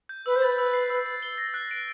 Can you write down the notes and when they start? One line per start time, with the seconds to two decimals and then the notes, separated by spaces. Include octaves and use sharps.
0.09 G6
0.25 B4 E6
0.35 C5
0.42 B4 A6
0.58 E6
0.74 C7
0.90 E6
1.06 A6
1.22 G7
1.38 A#6
1.54 F#6
1.71 D7